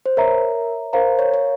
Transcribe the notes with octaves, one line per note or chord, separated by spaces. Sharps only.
C5
A#4 C#5 E5 A#5
A#4 C5 F5 A#5
C#5
C#5